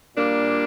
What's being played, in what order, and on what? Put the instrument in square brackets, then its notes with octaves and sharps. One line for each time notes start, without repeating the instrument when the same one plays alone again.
[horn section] A#2 G3 A#3 D4